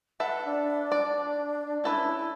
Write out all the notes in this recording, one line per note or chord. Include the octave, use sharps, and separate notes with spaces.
A4 B4 E5 F#5
D4
D5
C#4 E4 A4 B4